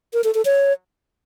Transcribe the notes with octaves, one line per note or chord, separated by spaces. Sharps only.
A#4
A4
A4
C#5